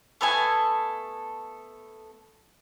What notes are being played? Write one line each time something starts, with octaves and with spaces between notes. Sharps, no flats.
A3 B3 A4 G#5